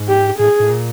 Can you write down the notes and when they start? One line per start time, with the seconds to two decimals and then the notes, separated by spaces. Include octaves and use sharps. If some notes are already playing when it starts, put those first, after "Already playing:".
Already playing: G#2
0.08 G4
0.39 A2 G#4
0.60 A2
0.70 A#2